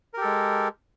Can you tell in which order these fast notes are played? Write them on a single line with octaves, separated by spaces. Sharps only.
A#4 G4 A4 G#3